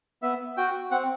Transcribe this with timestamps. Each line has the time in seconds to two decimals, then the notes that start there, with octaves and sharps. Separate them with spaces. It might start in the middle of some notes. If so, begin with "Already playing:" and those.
0.22 B3 E5
0.57 F#4 G5
0.91 C4 F#5